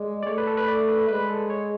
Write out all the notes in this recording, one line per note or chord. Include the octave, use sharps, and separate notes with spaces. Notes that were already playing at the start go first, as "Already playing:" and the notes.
Already playing: G#3 D5
D5
A3 C#5
B4
A4
B4
D5
B4
G#3 B4
A4
C#5